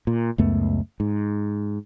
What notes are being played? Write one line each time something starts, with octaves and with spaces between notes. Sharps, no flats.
A#2
C#2 F#2 A3 B3
G#2